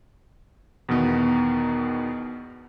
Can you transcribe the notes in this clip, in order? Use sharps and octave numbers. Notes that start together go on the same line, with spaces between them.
E2 B2 D#3 B3